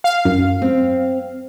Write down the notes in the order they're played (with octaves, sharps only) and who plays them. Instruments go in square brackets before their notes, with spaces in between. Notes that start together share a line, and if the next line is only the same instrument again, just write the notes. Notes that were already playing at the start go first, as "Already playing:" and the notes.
[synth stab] F5
[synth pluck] F#2
[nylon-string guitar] C4